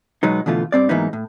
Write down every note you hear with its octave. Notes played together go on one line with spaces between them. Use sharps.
B2 F#3 G#3 B3 D#4
B2 D3 E3 A3 F4
G2 C4 D5
G#2 E3 F#3 A#3 B3 D#4
A2